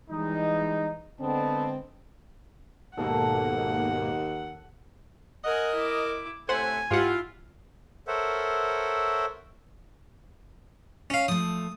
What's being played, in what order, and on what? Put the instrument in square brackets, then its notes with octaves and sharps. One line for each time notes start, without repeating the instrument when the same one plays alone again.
[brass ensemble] E3 G3 G#3 [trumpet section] D#4
[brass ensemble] D3 G#3 C4 [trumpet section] B3 D#5 A5
[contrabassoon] D#2 [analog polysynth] G#2 B2 A#3 [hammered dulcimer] A4 [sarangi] F#5
[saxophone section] A#4 D#5 [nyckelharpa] F#5 G#5
[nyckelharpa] E4 D6
[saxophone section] A2 C3 A3 [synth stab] C5 F#5 [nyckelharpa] G#5
[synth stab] G#2 G4 F#5 [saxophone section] E4 F4
[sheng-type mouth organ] A4 A#4 C5 C#5 E5 F#5
[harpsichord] C#4 F5
[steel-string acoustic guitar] F3 A3 [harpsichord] D#6